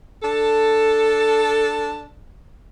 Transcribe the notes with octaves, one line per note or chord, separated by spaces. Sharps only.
D4 A4